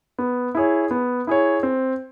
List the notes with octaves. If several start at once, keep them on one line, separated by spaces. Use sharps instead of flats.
B3
E4 G#4 C#5
B3
E4 G#4 C#5
C4